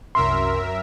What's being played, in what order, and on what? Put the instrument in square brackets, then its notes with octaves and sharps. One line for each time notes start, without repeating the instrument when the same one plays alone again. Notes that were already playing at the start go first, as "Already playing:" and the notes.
[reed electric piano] C2 C6 [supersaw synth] F#2 A#4 E5